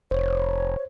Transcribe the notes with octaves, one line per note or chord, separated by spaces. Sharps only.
F1 C5 C#5